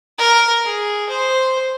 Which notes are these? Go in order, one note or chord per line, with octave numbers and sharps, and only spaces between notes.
A#4
G#4
C5